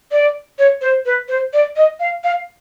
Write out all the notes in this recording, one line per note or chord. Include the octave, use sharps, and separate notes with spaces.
D5
C#5
C5
B4
C5
D5
D#5
F5
F5